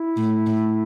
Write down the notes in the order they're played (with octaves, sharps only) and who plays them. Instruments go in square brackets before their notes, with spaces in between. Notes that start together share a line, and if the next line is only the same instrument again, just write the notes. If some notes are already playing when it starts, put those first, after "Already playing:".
Already playing: [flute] E4
[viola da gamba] A2
A2